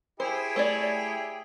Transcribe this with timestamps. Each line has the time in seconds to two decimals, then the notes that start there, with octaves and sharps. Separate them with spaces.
0.20 E4 G4 G#4 C5
0.56 A3 C#5 D5